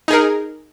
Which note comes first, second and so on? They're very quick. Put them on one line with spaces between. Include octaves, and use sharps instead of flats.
D#4 G#4 A#4